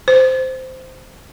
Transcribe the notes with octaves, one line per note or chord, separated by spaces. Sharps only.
C5